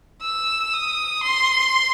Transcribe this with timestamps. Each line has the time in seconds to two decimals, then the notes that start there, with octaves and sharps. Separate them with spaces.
0.22 E6
0.73 D#6
1.23 C6